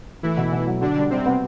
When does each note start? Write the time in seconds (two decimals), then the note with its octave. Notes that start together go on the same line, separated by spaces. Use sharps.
0.23 E3 A3 E4
0.37 B2
0.52 B2
0.67 F#3
0.81 D3 D4 F#4
0.96 G3
1.10 C3 G3 C4
1.26 B3